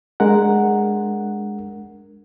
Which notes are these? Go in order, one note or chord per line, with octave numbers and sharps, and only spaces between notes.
G#3 D4 A#4 F#5